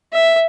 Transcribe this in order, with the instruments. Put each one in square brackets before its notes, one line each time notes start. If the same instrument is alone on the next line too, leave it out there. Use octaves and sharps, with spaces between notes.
[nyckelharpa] E5